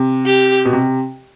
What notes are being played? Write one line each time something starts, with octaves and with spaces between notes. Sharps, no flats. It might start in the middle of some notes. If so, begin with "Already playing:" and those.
Already playing: C3
G4
B2
C3